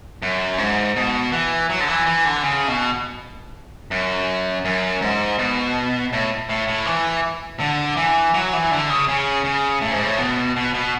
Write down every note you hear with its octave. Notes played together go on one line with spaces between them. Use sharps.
F#2
G#2
B2
E3
F#3
D3
E3
E3
D3
C#3
B2
F#2
F#2
G#2
B2
A2
A2
A2
E3
D3
E3
F#3
E3
D3
C#3
C#3
C#3
A2
G#2
A2
B2
B2
B2